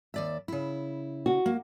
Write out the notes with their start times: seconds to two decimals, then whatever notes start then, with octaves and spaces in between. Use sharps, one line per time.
0.14 D#2 D5 E5
0.48 C#3 E4
1.26 F#4
1.46 A#3